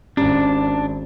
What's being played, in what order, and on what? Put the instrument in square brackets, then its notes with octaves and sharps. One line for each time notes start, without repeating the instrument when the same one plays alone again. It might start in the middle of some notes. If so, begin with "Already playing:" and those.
[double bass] G#1 [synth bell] C#4 [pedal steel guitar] D4